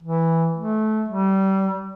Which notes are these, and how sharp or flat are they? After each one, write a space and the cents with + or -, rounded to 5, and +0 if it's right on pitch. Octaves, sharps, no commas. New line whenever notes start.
E3 -5
A3 -25
G3 -25